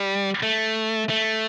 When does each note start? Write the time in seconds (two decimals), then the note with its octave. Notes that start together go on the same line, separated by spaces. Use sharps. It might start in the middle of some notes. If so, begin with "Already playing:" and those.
Already playing: G3
0.43 A3
1.09 A3